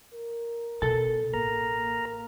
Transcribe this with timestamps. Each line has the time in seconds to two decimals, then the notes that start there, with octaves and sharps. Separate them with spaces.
0.14 A#4
0.82 B2 A4 A5
1.34 A1 A#3 A#4 A#5